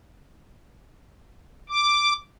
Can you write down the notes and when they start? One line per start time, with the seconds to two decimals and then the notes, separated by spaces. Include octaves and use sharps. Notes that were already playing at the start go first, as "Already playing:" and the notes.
1.69 D6